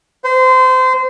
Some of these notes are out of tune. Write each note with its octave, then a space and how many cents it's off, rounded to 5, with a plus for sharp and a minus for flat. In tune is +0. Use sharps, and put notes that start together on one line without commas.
C5 -25